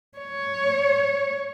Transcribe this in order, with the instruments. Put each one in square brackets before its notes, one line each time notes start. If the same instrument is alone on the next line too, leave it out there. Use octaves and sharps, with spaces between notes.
[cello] C#5